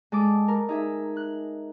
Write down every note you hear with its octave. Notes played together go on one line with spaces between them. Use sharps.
G#3 A4 D6 D#6
A#4
D#4 G#4 E5
F#6